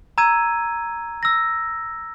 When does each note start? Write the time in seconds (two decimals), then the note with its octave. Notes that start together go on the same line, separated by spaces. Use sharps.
0.18 A#5 E6 G#6 D#7
1.23 E6 A#6